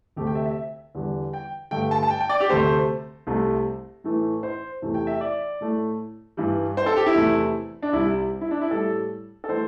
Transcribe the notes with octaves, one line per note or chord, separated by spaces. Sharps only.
D2 C3 A3 G4
G5
E5
E5
E2 D3 G3
G5
G2 D3 A3 G5
A5
A5
G5
G5
D5
G4
D2 C3 A3 C5
C2 C3 A3
A2 E3 A3
C5
E2 C3 E3 A3
G5
E5
D5
A2 A3
G2 E3 G3
C5
A4
G4
E4
E2 C3 A3
D4
C2 C3 G3 E4
E4
D4
E4
A2 G3 A4
A4
E3 A3 C5